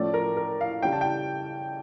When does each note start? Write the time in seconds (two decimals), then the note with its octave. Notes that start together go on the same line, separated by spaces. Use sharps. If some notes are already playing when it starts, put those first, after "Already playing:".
Already playing: A2 F3 A3 C#4 D5
0.14 A#4
0.37 A#4
0.61 F5
0.83 C#3 G3 C#4 G5
0.92 A5
1.01 G5